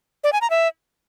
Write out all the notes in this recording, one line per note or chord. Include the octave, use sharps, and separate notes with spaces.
D5
G#5
A#5
E5